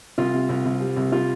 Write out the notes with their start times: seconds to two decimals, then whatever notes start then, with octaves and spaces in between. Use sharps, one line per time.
0.18 C2 F4
0.34 C3
0.49 C2
0.65 C2
0.81 G3
0.97 C2
1.12 G3 F4